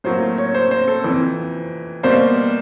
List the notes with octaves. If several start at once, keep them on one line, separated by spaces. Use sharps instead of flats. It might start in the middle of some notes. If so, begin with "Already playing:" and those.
A2 F#3 A#3 C5
C#5
C5
C5
A4
F2 C3 E3
B2 G3 A#3 C5